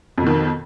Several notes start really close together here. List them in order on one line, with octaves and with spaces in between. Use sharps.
F2 B2 D#3